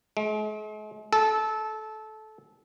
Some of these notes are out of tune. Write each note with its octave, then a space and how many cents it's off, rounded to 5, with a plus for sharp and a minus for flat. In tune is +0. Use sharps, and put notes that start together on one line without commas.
G#3 +45
A4 -20